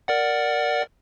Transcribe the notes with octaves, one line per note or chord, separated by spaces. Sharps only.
A#4 D5 F#5